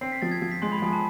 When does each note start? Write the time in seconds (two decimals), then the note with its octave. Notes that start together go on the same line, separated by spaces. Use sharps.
0.01 C4 C7
0.12 B6
0.22 F3 A6
0.32 G#6
0.42 F3 G#6
0.52 B6
0.62 G#3 C6
0.72 B5
0.82 F3 G#5
0.93 A5